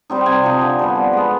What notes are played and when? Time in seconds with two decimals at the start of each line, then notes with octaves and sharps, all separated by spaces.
0.10 G3 C4 D#4
0.21 G5
0.26 C3 G#5
0.44 F3 A#3 D#4
0.61 D3
0.79 G3 B3
0.95 F3
1.13 G#3 B3